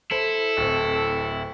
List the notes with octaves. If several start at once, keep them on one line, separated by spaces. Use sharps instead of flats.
E4 A4 C5
D1 C4